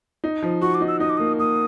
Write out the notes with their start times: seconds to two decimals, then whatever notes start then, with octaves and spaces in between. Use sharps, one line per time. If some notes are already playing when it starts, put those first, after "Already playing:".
0.24 D#4
0.42 F3
0.61 F#4 C#6
0.75 D6
0.81 D#4
0.88 E6
1.00 D#4 D#6
1.10 D6
1.17 A#3 D#6
1.39 A#3 D#6